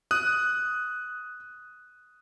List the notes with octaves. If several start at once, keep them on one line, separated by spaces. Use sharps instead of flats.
D#6 F#6